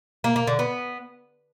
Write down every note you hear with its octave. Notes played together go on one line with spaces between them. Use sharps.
A#3
A#3
D3
B3